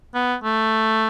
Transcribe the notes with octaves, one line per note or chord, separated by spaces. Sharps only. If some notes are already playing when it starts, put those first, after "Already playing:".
B3
A3